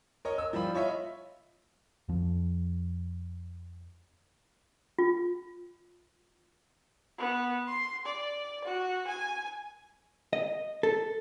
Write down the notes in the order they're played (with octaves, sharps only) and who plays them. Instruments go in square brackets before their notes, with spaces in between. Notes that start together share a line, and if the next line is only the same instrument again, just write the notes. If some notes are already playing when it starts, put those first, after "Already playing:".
[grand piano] A#4 C#5 D#5
E6
F3 G3 F4 B5
F4 C#5 D#5 E5
[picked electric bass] F2 F3
[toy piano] F4
[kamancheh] B3
C6
D5
F#4
G#5
[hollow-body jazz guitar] D#5
A4